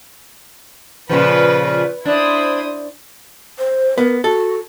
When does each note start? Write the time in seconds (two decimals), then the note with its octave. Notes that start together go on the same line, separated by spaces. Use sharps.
1.09 A#2 C#3 F3 B4
2.05 D4 E4 C5 D#6
3.58 C5
3.98 B3 A#4
4.24 F#4 A4